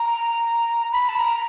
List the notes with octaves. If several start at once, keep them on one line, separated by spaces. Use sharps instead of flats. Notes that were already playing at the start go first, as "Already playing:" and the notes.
Already playing: A#5
B5
A5
A#5